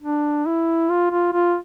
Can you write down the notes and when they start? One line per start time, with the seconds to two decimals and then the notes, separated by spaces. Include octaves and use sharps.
0.02 D4
0.46 E4
0.90 F4
1.11 F4
1.33 F4